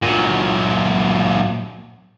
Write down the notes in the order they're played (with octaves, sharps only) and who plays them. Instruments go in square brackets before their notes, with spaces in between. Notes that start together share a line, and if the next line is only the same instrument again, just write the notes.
[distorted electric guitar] A#2 F#3